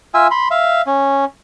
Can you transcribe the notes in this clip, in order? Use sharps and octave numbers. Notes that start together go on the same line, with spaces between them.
F4 E5 G#5 E6
B5 C6
E5 F5
C#4